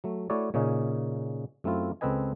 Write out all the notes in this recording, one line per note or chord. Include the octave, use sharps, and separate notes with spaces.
F#3 A3
A3 E4 F#4 A4 C#5 D5
A#2 C#3 C#4 D#4 G#4
F#2 A3 C4 E4 F4
C#2 C4 A4 B4 D#5 G#5